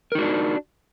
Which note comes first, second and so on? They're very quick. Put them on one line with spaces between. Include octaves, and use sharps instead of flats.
A#4 D#4 F#4 D4